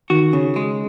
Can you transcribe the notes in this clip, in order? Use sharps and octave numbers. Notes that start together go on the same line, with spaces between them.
D#3 F#4
C#3
G#3